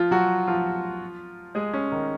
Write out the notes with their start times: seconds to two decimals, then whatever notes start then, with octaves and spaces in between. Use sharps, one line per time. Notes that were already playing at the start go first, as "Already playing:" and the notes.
Already playing: F3 F4
0.11 F#3 F#4
0.47 F3 F4
1.55 G#3 G#4
1.74 C#4
1.92 D#3 D#4